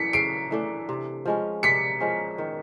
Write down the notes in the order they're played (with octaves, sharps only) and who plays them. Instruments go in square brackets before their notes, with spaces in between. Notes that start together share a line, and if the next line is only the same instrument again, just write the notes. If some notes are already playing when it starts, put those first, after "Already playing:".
Already playing: [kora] E3 A3 [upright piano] B6 C#7
[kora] C#3 [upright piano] C7 D7
[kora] E3 A3 D4
C3
F3 G#3 C#4
[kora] C3 [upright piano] B6 C#7
[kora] F3 G#3 C#4
D#3